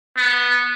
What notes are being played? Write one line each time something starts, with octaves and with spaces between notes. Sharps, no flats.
B3